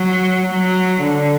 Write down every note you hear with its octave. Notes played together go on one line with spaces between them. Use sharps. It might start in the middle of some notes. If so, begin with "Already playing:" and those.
Already playing: F#3
F#3
D3